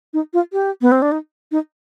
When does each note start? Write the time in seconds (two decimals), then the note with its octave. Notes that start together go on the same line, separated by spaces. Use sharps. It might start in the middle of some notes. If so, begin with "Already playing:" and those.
0.14 D#4
0.33 F4
0.53 G4
0.82 B3
0.92 C4
1.02 D4
1.12 D#4
1.52 D#4